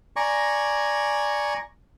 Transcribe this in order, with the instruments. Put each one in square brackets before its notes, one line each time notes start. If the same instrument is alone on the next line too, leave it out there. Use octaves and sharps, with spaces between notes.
[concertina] D5 G#5 A#5 C#6